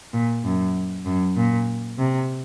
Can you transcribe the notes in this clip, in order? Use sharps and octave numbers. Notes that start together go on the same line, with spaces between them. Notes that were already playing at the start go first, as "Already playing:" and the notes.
A#2
F#2
F#2
A#2
C3